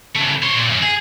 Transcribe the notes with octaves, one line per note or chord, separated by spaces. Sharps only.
C#3 A3
C5 C#5
A#2
F#2
G#4